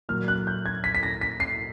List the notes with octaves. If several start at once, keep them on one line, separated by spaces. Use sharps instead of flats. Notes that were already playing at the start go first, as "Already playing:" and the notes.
A#2 F#3 A#3 F6
F#6
G6
G#6
B6
B6
A#6
B6
C7